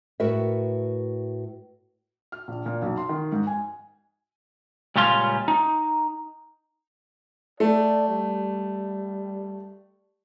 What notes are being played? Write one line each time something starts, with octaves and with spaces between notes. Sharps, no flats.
A2 F#4 A#4 B4 E5
F6
A#1
A#2
B1
C6
D#3
G#2
G#5
C#2 A#2 G3 C#4 F4 C6
D#4
A3 D5
G3